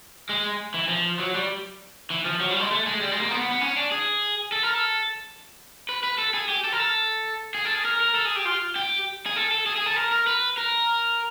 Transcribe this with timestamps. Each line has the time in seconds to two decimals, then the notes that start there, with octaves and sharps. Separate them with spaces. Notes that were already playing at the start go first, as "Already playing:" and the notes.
0.29 G#3
0.74 E3
0.89 F3
1.19 F#3
1.35 G3
2.10 E3
2.25 F3
2.40 F#3
2.50 G3
2.60 G#3
2.71 A3
2.86 G#3
3.01 G3
3.11 G#3
3.21 A#3
3.31 B3
3.41 B3
3.51 B3
3.61 C#4
3.77 D4
3.91 G#4
4.52 A4
4.63 A#4
4.73 A4
5.89 B4
6.03 B4
6.18 A4
6.34 G#4
6.49 G4
6.64 A4
6.72 A#4
6.79 A4
7.55 G#4
7.65 A4
7.75 G#4
7.85 A#4
8.00 A#4
8.15 A4
8.25 G#4
8.36 G4
8.45 F4
8.76 G4
9.26 G#4
9.36 A4
9.51 A4
9.66 G#4
9.76 G#4
9.86 A4
9.96 A#4
10.12 A#4
10.27 B4
10.57 A#4